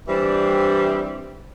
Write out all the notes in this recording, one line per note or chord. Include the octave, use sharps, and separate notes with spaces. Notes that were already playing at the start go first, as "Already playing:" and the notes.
E3 G3 C4 D4 G4